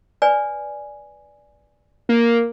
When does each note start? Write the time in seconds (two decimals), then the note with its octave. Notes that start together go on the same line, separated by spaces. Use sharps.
0.22 B4 D5 G#5
2.09 A#3